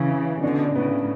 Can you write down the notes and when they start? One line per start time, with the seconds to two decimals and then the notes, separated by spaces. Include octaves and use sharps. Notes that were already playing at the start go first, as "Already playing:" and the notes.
Already playing: C#3 E3 E4
0.10 C#4
0.43 B2 D3 D4
0.75 A2 C#3 B3